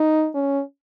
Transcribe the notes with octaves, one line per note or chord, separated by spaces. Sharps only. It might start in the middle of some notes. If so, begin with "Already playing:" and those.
Already playing: D#4
C#4